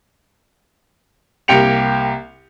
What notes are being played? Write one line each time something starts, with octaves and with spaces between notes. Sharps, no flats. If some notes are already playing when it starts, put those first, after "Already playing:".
C2 A#3 G4 G5 C#7 F7